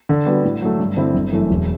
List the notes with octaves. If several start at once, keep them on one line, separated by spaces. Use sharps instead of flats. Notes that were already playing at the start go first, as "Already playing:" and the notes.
D3
G3 B3 F#4
A2
F#3 A3
G2
D3 G3 C4 E4
G1
F#2 E3 A3
E1